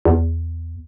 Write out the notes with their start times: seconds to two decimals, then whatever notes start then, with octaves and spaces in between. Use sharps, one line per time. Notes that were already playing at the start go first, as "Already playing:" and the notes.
0.05 E2